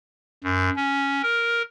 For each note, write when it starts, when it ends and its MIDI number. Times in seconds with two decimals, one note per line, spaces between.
0.44 0.70 42
0.76 1.22 61
1.23 1.62 70